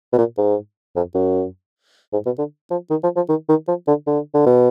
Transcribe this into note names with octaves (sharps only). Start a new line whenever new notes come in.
B2
A#2
G#2
F2
F#2
G#2
B2
D3
F3
D#3
F3
F3
D#3
D#3
F3
D3
D3
D3
B2